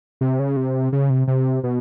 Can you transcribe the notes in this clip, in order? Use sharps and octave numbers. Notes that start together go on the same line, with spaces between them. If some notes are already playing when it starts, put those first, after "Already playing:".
C3
C#3
C3
C#3
C3
C3
B2